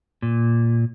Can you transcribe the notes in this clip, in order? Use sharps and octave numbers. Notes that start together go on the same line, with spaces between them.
A#2